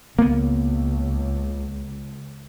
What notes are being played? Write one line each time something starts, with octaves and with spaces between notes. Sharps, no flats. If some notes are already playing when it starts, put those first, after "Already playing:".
C#2 A#3 B3